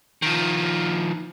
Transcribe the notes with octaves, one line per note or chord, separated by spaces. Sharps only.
D#3 F3